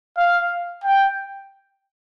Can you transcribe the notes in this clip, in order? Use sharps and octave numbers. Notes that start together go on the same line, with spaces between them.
F5
G5